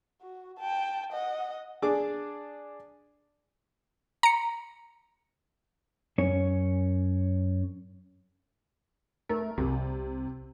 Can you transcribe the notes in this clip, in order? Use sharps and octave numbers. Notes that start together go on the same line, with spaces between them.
F#4
G5 A5
D#5 F#5
D4 G#4 D6
A#5 C#7
F#2 C#4 C#5
A3 A#4
C2 C3